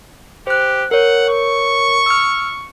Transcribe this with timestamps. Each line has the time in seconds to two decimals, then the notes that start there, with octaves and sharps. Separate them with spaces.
0.47 G4 C5 F#6
0.91 A#4 C#5 F#5
1.29 C#6
2.06 E6 F6